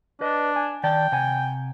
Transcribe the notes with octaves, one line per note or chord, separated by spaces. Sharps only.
D4 B4 D#5
G#5
D#3 D5 G5 A5
C3 F#5 G#5